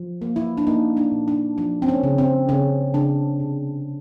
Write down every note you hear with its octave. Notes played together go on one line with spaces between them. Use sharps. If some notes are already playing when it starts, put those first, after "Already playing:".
Already playing: F3
A#3
E4
D4
A#3 D#4
D4
A#2
D4
F3 D4
C4
C#4
C#3
C4
C#3 C#4
C#3 D4
C3